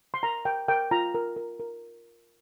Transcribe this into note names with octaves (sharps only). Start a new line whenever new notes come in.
C6
A#4 A#5
A#4 G5
A#4 G5
F4 A#5
A#4
A#4
A#4